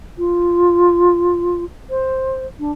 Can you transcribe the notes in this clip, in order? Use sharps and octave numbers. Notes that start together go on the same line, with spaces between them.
F4
C5
D4